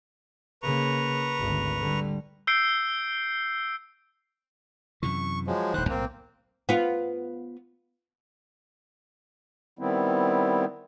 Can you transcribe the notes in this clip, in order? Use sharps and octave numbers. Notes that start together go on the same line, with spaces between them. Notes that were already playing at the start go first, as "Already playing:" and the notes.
C#3 A#3 B4 A#5 C#6
G#1 D2
D3 G3
E6 G6 C7 D7
F#2 C3 E3 C#6
F3 F#3 G#3
D#1 A2 D#3 C5 F#6
B1 A2 A#3 C4
B3 F4
D#3 G3 B3 C4 E4